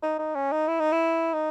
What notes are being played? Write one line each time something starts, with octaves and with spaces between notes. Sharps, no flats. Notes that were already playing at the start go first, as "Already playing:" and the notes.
D#4
D#4
C#4
D#4
E4
D#4
E4
D#4